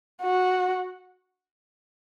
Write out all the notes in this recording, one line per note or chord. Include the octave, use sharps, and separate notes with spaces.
F#4